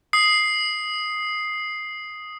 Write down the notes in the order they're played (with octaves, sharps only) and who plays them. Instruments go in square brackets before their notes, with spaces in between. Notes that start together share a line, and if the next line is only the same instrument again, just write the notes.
[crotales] D#6 C7